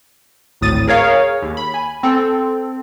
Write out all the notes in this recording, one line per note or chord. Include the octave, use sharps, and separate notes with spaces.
G#1 D2 A2 D#6 A6 D#7
G#4 A#4 C#5 F5
D#2
B5
G#5
C4 A4